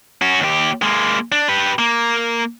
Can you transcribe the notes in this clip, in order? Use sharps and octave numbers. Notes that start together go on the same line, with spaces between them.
C#4 F#4
D#2 G4
G#3 A#3
D4
G4 B4
A#3